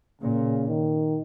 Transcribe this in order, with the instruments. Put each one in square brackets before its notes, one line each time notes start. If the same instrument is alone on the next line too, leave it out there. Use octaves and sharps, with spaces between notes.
[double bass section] A#2 [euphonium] C#3
[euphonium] D#3